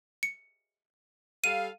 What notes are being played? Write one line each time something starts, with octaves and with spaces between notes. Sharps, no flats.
C#7
G3 A4 F5 D#7